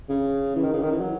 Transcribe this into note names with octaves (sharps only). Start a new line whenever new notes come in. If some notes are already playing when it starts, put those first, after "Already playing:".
C#3
E3
D#3
C#3
D#3
E3
F#3